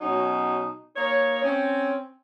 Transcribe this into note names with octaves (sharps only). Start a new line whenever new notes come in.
B2 F#3 C#4 D#4
A#3 D#4 C#5
C4 C#4